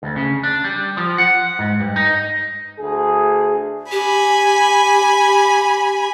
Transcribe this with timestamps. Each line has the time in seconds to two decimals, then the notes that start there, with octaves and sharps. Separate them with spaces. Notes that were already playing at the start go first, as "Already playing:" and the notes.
0.03 D2
0.16 C#3
0.43 D4
0.64 G3
0.97 F3
1.18 F#5
1.59 G#2
1.80 G2
1.96 D#4
2.79 D2 G#4
3.91 G4 G#5 B5